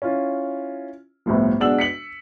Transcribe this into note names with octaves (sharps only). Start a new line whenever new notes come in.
C#4 E4 F4
G1 C2 A2 F3
B1 G#3 D4 F#5 E6 F#7
B6 C#7 F#7